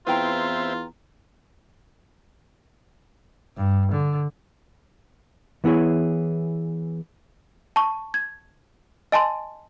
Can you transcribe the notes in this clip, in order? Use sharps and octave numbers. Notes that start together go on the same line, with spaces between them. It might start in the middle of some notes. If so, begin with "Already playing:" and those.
E2 C4 E4 F4 B4 G5 A#5
G2
D3
E3 B3 E4 G#4 C#5
A5 C#6
G#6
D#5 G#5 A5 C6